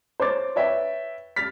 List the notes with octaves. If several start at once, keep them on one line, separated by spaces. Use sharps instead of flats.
C5 C#5 D6 A6
B4 C#5 E5 G5
F6 A6 B6